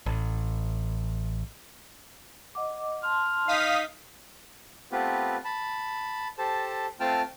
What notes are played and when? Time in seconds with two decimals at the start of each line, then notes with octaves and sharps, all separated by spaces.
0.06 A1
2.55 D#5 F#5 D6
3.03 A5 C6 F6
3.48 D#4 F5 D#6 B6
4.92 A3 B3 C4 F4 G4 B4
5.44 A5 B5
6.38 G4 A4 C5 A5
7.00 A3 C4 F4 G5 A5 F6